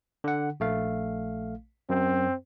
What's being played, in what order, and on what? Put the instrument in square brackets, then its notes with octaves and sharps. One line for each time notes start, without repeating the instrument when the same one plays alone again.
[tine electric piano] D3 F#5
A#1 A3 F5
[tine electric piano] F#2 [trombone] C4